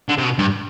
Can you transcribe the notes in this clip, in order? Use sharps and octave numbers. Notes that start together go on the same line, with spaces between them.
D3
C3
B2
G2